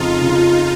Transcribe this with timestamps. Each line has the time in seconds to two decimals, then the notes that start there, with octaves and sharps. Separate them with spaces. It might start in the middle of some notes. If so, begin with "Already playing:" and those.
Already playing: F2 C#3 D#4 F4
0.21 C#3 F3